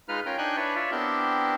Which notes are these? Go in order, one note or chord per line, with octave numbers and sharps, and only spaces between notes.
G#3 D#4 F4 B4 F6
C#4 F4 A#4 G5
D4 D#4 G5 G#5 F#6
D4 E4 B4 C#5 D5
F4 C#5 D5 E5
B3 C4 D4 E4 G4 A#4